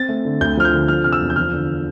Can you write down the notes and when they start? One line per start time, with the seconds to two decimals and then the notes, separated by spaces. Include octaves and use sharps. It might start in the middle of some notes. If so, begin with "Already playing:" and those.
Already playing: C4 A6
0.09 A3
0.25 D3
0.41 D2 G6
0.57 F3 F6
0.65 G6
0.72 D3
0.88 F3 F6
1.04 C3 F6
1.12 E6
1.21 E2
1.30 G6
1.36 F3 F6
1.53 D3